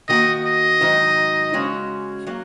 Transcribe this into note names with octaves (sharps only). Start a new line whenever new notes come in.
D#3 A#3 F#4 D#5
D#5
G#2 D#3 F#3 D#4
C#3 G#3 C#4 F#4
F#3 A#3